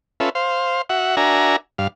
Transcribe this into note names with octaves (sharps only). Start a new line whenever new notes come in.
C#4 F4 A4 B4 E5
C5 F5
F#4 E5 F#5
D4 F#4 A#4 E5 G#5 A#5
G2 F5